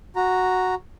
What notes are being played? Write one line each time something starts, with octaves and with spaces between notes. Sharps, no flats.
F#4 A#5